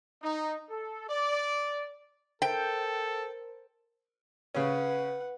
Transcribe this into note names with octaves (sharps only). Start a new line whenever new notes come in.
D#4
A4
D5
A4 A#4 C5 G5
C#3 C#4 B4 F#5